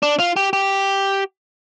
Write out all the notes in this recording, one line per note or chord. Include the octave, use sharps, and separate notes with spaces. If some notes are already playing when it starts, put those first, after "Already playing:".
D4
F4
G4
G4